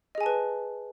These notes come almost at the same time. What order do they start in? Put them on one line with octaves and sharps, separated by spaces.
D#5 G#4 G#5 A5 B4